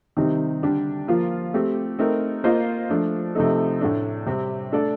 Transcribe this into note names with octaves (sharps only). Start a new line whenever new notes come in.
C3 D#3 G3 C4 D#4
D3 G3 D4 G4
F3 A#3 F4
A3 C4 G4
A3 C4 D#4 A#4
A#3 F4 C5 D#5
F3 A3 D4
C3 F3 A3 D#4 A4
A2 A3 D4
C3 G3 C4 G4
A3 D4 A4 D5